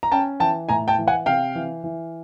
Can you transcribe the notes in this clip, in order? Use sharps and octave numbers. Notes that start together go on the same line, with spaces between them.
A#5
C#4 G5 A5
E3 G5 A5
A2 G#5 A#5
G5 A5
E3
F#5 G#5
C3 F5 G5
E3
E3